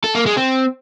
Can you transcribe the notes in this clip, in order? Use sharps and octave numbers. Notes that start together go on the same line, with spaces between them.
A4
A#3
G#3
C4